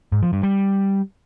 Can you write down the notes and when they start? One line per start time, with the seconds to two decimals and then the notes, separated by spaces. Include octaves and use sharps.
0.12 G#2
0.23 F3
0.33 G2
0.43 G3